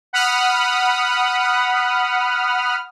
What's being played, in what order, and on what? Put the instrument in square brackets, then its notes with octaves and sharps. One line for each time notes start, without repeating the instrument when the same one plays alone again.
[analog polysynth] F#5 B5 D#6 F6